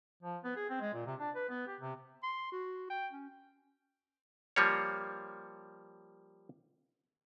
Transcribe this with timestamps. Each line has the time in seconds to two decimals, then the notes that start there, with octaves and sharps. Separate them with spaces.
0.23 F3
0.44 B3
0.56 G#4
0.70 C4
0.81 G#3
0.94 A#2
1.07 C3
1.19 D4
1.35 B4
1.49 B3
1.67 G4
1.81 C3
2.23 C6
2.52 F#4
2.90 G5
3.12 C#4
4.56 F3 G3 A#3 C#5